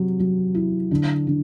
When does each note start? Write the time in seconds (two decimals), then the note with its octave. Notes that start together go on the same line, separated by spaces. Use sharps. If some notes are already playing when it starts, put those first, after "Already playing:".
Already playing: C3 F#3
0.19 F#3
0.55 E4
0.91 D3
1.27 D3